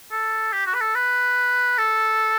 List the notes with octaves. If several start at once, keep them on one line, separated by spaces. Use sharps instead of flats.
A4
G4
F#4
B4
A4
B4
A4